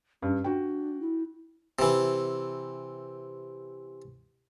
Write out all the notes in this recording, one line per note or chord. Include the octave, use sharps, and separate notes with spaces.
G2 C#4
D4 F#4 G5
E4
C3 E3